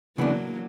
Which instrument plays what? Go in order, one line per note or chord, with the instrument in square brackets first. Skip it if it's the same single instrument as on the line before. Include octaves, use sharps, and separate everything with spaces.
[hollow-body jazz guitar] C#3 E3 B3 D4 [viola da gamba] F#3 A#3